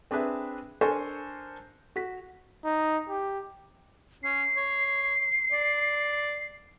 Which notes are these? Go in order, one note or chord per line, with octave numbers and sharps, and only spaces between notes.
C4 D4 G#4 B4 E5
D4 A4 A#4 C5 G#5 C#6
F#4 B6
D#4
G4
C#4 C7
C#5
D5